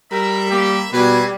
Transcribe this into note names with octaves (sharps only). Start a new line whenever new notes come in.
G3 A#4 E5 B5
A#3 G4
B2 G3 C4 B4 G#5